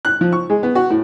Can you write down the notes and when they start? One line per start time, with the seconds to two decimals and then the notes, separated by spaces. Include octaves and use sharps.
0.05 F#6
0.21 F3
0.33 C#6
0.50 G#3
0.63 B3
0.75 F#4
0.90 A2